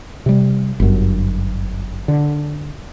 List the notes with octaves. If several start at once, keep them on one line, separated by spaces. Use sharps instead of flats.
C3 G3
G1 F#2
D3